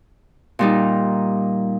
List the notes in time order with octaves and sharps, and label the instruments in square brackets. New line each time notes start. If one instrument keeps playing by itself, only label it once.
[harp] A#2 G3 D#4